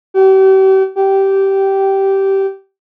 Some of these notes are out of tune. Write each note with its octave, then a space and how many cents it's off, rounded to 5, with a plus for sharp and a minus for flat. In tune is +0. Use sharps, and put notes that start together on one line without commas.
G4 -40
G4 -15